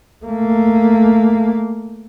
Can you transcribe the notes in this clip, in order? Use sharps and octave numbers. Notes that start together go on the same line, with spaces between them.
A3 A#3